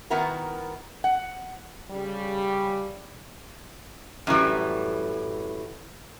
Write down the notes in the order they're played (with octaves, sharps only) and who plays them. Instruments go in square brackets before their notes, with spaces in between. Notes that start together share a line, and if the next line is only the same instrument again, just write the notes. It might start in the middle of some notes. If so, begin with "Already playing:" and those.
[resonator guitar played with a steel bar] D#3 B3 E4 F#4 A#4
F#5
[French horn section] C#3 G3
[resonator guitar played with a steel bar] F#2 A2 E3 G3